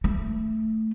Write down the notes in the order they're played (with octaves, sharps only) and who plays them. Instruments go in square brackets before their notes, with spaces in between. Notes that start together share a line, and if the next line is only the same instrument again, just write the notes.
[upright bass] A3